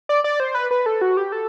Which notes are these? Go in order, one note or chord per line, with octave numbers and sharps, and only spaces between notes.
D5
D5
C5
B4
B4
A4
F#4
G4
A4